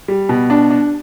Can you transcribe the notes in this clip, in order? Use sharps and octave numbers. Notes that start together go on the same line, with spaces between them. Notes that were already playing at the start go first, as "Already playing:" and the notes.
G3
B2
D4
D4